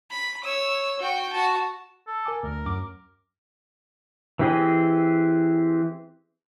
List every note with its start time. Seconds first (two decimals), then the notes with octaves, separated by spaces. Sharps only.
0.10 B5
0.44 C#5 E6
0.99 F#4 G5
1.32 F#4 A5
2.07 A4
2.26 A#4 G#5 D6
2.43 D2 A#4
2.66 F#2 D6
4.39 E3 C4 G4 G#4 D#5